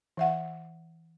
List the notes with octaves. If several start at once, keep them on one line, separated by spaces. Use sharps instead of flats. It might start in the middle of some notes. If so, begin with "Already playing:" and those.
E3 E5 F#5